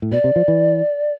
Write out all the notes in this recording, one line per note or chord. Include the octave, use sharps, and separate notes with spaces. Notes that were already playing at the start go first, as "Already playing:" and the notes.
A2
B2 D5
C3
F3
E3